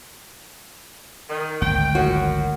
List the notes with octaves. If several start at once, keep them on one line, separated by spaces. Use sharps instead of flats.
D#3
G#1 D2 G5
F#2 F#4